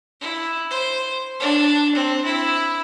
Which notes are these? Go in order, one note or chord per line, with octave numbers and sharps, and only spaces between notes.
E4
C5
D4
C4
E4